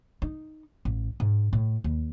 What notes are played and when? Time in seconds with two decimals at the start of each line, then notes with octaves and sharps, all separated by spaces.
0.22 D#4
0.85 A1
1.20 G#2
1.53 A2
1.84 D#2